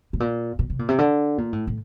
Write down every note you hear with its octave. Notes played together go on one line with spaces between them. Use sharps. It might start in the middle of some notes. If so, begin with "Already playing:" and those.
A2
A#2
A#2
C3
A#2
C3
D3
A#2
A2
A2